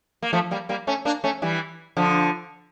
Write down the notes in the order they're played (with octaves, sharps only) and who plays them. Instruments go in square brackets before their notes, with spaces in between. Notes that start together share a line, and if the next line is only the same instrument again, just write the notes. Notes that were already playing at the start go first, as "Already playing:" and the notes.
[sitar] A#3
F3 A3
G3 A#3
G3 A#3
A3 C#4
A#3 D4
A3 C#4
E3 G3
D3 F3